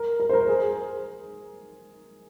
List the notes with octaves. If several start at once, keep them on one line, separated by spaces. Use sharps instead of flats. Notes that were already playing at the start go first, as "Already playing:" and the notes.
Already playing: A#4
A#4
C5
A#4
G#4